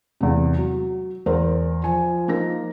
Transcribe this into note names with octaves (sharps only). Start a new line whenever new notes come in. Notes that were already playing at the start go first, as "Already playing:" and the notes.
E2 C3
F#3
E2 A#4 C5
F3 G#5
A#3 D#4 A#6